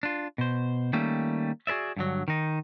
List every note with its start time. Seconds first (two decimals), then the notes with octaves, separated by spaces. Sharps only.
0.03 D4 F4
0.38 B2 C5
0.93 D#3 G3 A3 A#3 C#4
1.67 F#4 G#4 B4 D5 E5
1.97 G2 D3 F#3
2.28 D#3 D#4